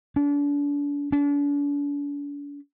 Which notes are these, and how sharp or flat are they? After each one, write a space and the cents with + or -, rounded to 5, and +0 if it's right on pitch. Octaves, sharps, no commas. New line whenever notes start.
D4 -35
D4 -40